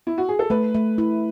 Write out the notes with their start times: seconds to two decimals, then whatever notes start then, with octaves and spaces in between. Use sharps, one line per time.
0.07 E4
0.18 F#4
0.29 G#4
0.39 A4
0.50 A3 B4
0.74 A3
0.98 E4